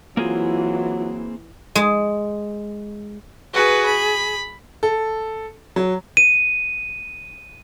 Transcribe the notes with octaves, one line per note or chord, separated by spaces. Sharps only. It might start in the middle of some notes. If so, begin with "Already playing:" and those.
E3 F#3 A#3 C4 F4 G#4
G#3
F#4 G#4 B4
B5
A4
F#3
D#7